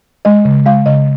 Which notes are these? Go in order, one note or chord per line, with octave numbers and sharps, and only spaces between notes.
G#3 D#5
C#3
G#3 F5
C#3 D#5